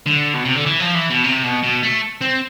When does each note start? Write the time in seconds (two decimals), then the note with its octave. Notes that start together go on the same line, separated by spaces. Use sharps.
0.07 D3
0.34 B2
0.45 C3
0.55 D3
0.66 E3
0.80 F3
0.95 E3
1.10 B2
1.24 C3
1.44 B2
1.63 B2
1.83 A3
2.21 C4